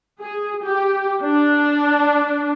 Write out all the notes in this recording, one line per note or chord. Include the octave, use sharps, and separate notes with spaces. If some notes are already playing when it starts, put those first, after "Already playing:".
G#4
G4
D4